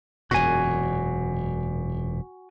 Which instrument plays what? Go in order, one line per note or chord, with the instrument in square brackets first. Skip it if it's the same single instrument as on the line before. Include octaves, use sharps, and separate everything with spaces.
[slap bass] E1 F#2 A#2 [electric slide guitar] F#4 G#5